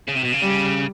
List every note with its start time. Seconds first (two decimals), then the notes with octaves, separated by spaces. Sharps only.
0.09 C#3
0.16 C3
0.25 B2
0.34 C#3
0.42 G3